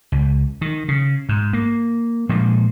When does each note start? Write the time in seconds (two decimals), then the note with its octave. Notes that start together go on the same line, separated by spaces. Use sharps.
0.12 C#2
0.61 D#3
0.88 C#3
1.29 G#2
1.53 A#3
2.29 A#2 F3 G#3